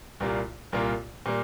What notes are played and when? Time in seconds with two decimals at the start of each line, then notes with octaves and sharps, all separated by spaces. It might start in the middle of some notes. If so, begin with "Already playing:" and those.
0.20 C2 A#2 G3 A#3 F4
0.72 C2 A#2 G3 A#3 F4
1.26 A#2 G3 A#3